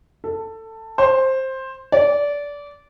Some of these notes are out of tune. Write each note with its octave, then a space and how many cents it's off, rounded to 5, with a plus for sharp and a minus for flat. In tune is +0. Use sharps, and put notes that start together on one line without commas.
A4 +15
C5 +10
D5 -20